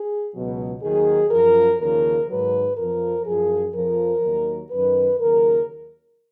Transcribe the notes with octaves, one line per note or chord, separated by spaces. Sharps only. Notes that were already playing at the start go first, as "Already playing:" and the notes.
Already playing: G#4
C#2 B2 F#3
D#2 D#3 F#3 G#4
F#2 F3 A#4
D#2 C#3 F3 A#4
G#2 D#3 F#3 B4
F2 F3 A#4
F#2 F3 G#4
F2 F3 A#4
D#2 D#3 F#3
F#2 D#3 F#3 B4
D#2 C#3 F#3 A#4